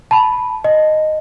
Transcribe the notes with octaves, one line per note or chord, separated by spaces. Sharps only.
A5 B5
D#5